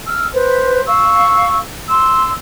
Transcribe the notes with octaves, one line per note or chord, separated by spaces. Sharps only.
E6 F6
B4 C5
F5 C#6 E6
C6 E6